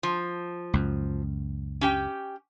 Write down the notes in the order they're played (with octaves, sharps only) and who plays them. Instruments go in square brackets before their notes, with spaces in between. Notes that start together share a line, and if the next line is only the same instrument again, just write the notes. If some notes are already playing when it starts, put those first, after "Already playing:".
[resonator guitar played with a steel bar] F3
[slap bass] C#2 F#2
[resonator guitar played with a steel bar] C#4 G4 G5